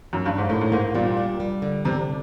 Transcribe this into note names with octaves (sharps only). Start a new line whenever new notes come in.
F#2
G2
G#2
A2 A#3
A2
G#2 A#3
A#2 G3
D4
G3
D3
C3 D4